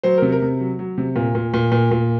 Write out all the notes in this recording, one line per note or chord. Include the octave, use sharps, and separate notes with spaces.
F#3 C5
C3 A#4
A#4
C3
F#3
F#3
C3
A#2
A#2
A#2
A#2
A#2